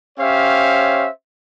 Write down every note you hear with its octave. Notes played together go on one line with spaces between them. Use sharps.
C#4 G4 C5 C#5 E5 F5